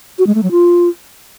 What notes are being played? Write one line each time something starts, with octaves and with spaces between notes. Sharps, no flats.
F#4
G#3
A3
F#3
F4